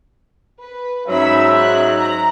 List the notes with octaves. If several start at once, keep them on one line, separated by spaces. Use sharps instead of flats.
B4
G#2 F#3 C#4 E5 B5 E6
F#6
A#5